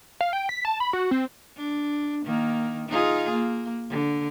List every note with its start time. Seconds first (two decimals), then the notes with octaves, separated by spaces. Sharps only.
0.21 F5
0.33 G5
0.49 B6
0.65 A5
0.80 B5
0.93 F#4
1.11 C4
1.57 D4
2.24 D#3 A#3
2.88 D#4 F4 G#4
3.30 A#3
3.90 D3